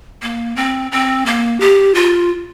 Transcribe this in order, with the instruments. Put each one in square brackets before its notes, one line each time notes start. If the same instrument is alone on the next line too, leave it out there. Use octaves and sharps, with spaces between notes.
[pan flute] A#3
C4
C4
A#3
G4
F4